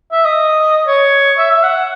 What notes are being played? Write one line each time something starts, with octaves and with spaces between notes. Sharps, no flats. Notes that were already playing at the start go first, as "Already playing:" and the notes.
E5
D#5
C#5
E5
E5
F#5